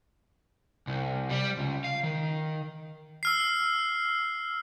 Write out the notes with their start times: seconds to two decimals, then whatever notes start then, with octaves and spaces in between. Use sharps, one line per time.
0.87 C2
1.30 G3
1.57 C#2
1.84 F5
2.03 D#3
3.23 E6 F6 C7